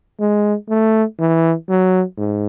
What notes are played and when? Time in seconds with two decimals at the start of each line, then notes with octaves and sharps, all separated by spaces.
0.20 G#3
0.69 A3
1.19 E3
1.68 F#3
2.17 G#2